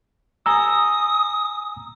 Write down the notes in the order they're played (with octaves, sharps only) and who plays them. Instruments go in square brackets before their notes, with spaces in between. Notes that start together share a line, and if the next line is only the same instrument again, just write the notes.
[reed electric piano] G#5 A#5 E6 [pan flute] D#6